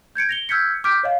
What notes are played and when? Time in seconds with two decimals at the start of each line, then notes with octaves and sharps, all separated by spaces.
0.15 G6 G#6 C#7 D7
0.29 A#6 F7 G7
0.49 E6 F6 G6 G#6 B6 C#7
0.84 D6 F6 G6 B6 D7
1.03 C#5 D#5 F5